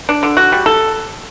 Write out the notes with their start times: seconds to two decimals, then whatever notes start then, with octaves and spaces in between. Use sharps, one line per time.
0.09 D4
0.23 D3
0.37 F#4
0.52 G3
0.66 A4